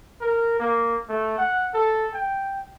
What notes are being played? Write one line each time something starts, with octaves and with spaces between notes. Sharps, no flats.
A#4
A#3
A3
F#5
A4
G5